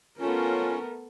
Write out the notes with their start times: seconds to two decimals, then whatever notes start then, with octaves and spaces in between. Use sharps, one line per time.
0.20 A3 B3 C#4 F4 A#4